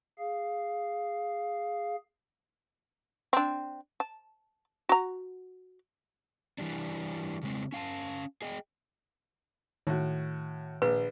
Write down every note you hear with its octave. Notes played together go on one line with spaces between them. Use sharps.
G#4 F5
C4 D4
A5
F#4 A#5
E3 G3 D4
C#3 G#3 C4
C#4 F5 G#5 A5
G#4 D#5 G5
A2 D#3 F#4
A#1 B4